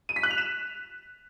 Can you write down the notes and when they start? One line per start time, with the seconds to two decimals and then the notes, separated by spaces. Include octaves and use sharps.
0.09 D#7
0.16 B6
0.23 F#6
0.31 F7
0.38 E7